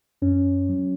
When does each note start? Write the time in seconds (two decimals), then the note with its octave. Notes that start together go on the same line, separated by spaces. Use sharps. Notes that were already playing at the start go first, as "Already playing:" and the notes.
0.22 F#2 C#4
0.69 F#3